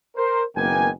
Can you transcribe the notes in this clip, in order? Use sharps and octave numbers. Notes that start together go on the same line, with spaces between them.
A#4 C5
F#1 D#3 A#3 B3 G5 G#5